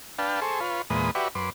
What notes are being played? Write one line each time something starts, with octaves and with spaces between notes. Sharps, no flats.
D4 B4 F5 G5 A5
G#4 A4 C5 C#6
F4 B4 C#5
E2 A#2 G#3 B4 D#6
F#4 G4 B4 D5 E5 C#6
F#2 B4 C6 D6